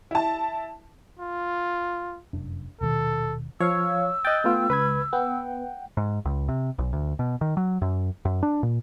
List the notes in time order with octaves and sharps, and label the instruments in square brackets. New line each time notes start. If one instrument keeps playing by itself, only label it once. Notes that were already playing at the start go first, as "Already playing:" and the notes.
[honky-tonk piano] E4 A5
[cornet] F4
[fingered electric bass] F1 F#2 D4
[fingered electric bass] D#1 B2 D#3 [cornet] A4
[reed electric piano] F3 [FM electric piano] C#5 F5 C#6 [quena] E6
[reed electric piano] D#5 F#6 A6 [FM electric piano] G5
[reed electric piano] A3 B3 F4
[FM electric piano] C#2 [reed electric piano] B4 B5 G#6
[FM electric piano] B3 [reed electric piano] F#5 G5
[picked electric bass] G#2
C#2
C3
B1
D2
B2
D#3
F#3
F#2
F#2
D4
A#2